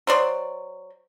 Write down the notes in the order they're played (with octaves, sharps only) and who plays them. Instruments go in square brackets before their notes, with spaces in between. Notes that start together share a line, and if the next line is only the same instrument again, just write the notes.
[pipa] F#3 C5 D5